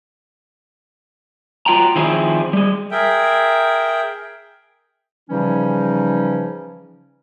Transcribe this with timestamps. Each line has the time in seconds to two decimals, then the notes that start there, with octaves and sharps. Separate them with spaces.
1.66 F#3 F4 G5 A#5
1.96 D#3 F3 C4 E4 G#4
2.53 G3 G#4
2.90 G#4 A#4 E5 G5
5.30 C#3 E3 F3 G3 C#4 D#4